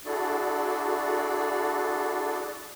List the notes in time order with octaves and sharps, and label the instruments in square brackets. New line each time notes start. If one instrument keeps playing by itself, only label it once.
[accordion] D4 E4 F#4 G#4 A4 D5